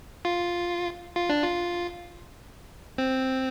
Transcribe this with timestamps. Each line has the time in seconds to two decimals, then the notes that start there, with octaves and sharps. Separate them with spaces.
0.25 F4
1.16 F4
1.30 D4
1.43 F4
2.98 C4